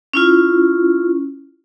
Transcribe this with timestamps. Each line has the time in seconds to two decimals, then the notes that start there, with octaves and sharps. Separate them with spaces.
0.14 C#4 E4 F4